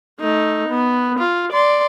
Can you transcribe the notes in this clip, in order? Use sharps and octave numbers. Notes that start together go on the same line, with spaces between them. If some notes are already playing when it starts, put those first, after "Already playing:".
A3 D#4
B3
F4
D5 C6